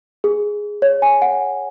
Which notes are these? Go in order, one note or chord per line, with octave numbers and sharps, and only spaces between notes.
G#4
C#5
G#5
F#5